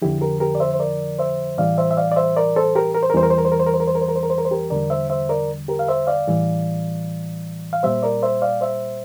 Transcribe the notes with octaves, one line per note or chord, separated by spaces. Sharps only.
F2 D3 F3 E4 G4
G4 A#4
G4 A#4
D5
C5 E5
C5
A#4 D5
C5 E5
A2 E3 G3 D5 F5
C5 E5
E5
D5 F5
D5
C5 E5
A#4 D5
A4 C5
G4 A#4
A#4
C5
A#4
E2 E3 G3 C5
A#4
C5
A#4
C5
A#4
C5
A#4
C5
A#4
C5
A#4
C5
A#4
C5
A#4
C5
A#4
C5
G4 A#4
E2 D3 G3 A#4 D5
C5 E5
C5 E5
A#4 D5
G4 A#4
F5
C5 E5
D5 F5
A2 E3 G3
F5
A#2 G3 C5 E5
A#4 D5
C5 E5
D5 F5
C5 E5